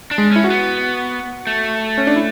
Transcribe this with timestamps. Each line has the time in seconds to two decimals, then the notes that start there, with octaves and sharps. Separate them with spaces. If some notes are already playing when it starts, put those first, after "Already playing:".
0.11 D4
0.18 G#3
0.31 C#4 E4
0.44 F#4
0.50 B3
1.47 A3
1.98 C#4
2.07 D4
2.16 E4